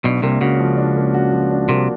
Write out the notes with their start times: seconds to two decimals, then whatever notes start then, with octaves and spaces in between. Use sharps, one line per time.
0.04 B1 B2 D4
0.22 C2 C3 A#3
0.41 C#2 C#3 F#4
0.59 F3
0.77 D4
0.96 A#3
1.14 F#4
1.32 F3
1.51 D4
1.69 C2 C3 A#3